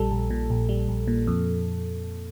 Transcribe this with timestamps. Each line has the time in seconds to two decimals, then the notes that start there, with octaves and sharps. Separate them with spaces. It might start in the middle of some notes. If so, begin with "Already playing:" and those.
Already playing: A#1 G3 A4
0.11 A#1
0.30 A#2
0.50 A#1
0.69 G3
0.89 A#1
1.07 A#2
1.27 F2